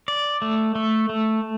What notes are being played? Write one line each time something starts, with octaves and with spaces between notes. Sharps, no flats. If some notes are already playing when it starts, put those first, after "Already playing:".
D5
A3
A3
A3